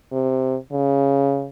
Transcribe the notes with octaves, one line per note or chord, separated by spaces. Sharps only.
C3
C#3